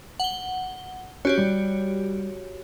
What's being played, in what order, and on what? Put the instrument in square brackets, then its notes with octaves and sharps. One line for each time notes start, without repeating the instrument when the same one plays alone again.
[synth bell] F#5 G7
[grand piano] C#4 [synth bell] F#4 G4 C#5
[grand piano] G3